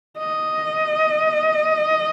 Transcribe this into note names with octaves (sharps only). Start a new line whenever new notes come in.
D#5